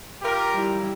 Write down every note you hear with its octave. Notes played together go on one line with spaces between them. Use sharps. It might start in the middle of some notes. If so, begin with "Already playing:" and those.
F4 G4 A#4
G3 E4